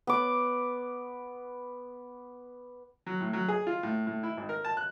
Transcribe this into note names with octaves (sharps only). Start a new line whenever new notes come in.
B3 D6
F#3
A2
F#3
G#4
F4
A2
A2
E4
G#1
A#4
A5
F#6